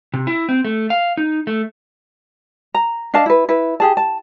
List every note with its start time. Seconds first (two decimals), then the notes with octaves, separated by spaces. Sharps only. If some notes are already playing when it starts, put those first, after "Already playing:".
0.14 C3
0.27 E4
0.49 C4
0.65 A3
0.90 F5
1.17 D#4
1.47 A3
2.74 A#5
3.14 D4 D#5 F5 A5
3.26 E4 B4
3.49 E4 B4
3.80 G4 G#4 A5
3.97 A5